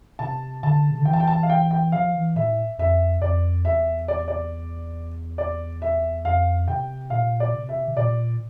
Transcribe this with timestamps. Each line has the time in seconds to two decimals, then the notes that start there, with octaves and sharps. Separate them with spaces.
0.19 C3 A5
0.63 D3 A5
0.91 C3
0.98 D3
1.05 E3 G5
1.13 A5
1.20 G5
1.27 A5
1.43 F5
1.50 G5
1.71 G5
1.92 F3 F5
2.14 E3
2.36 A2 E5
2.78 F2 E5
3.22 F2 D5
3.65 E2 E5
4.08 D5
4.28 D5
5.38 D5
5.82 E5
6.24 F2 F5
6.68 C3 G5
7.10 A#2 F5
7.40 D5
7.54 C3
7.69 E5
7.88 C3
7.97 A#2 D5